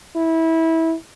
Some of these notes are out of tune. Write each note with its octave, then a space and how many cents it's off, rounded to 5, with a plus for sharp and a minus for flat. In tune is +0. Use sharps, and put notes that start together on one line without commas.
E4 -20